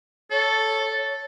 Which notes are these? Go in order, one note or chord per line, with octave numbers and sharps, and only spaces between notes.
A4 C#5